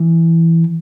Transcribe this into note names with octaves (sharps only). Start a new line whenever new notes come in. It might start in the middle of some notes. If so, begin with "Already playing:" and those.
Already playing: E3